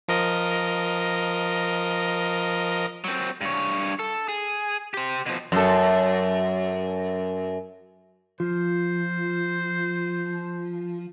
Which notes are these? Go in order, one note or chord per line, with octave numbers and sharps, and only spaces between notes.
F3 A#4 D#5
F#3 C4
G2 C#5
A4
G#4
G4 C5
B2 F3
F#2 A4
F3 F4 C5